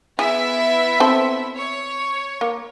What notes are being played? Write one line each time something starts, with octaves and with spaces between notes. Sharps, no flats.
B3 E4 G#4 E5
C4 A4 C5
C#5
A#3